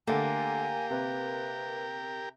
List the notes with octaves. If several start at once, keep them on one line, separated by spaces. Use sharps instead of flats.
D3 A3 A#3 G4 A#4 G#5
C3 B4